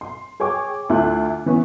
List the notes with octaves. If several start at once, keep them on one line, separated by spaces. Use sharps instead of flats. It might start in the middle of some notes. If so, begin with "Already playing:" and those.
C6
G#4 C#5 G5 D6
D2 E4 F4 C6 F#6
E3 B3 C#4